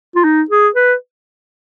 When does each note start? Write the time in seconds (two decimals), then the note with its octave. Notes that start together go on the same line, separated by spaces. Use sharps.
0.15 F4
0.24 D#4
0.50 G#4
0.75 B4